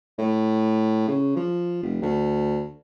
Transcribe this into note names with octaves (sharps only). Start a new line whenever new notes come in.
A2
C#3
F3
F1
D2